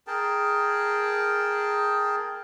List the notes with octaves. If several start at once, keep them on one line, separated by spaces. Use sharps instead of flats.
G#4 A#4 G5 A5